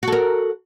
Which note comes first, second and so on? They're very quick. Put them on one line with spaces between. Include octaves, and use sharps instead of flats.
F#4 A4 A#4